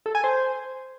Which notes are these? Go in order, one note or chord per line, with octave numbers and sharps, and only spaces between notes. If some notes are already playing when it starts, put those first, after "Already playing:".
A4
G#5
C5